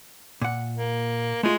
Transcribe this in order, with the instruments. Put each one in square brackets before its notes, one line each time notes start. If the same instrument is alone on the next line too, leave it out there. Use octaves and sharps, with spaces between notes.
[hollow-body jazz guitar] A#2 F#5
[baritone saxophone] A#3
[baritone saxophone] G#3 [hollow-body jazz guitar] A3 F4